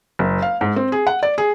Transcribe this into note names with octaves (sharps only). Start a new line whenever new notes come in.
F#1
F5
G#2
C4
G#4
F#5
D5
G#4